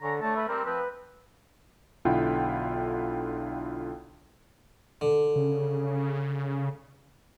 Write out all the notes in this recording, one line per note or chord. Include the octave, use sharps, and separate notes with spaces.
D3 C#5 G#5 A#5
A3 D4 C#5 A5
B4 E5
G3 C4 A#4
F3 C4 B4
B1 D3 E4 F4 F#5 G5
D3
C#3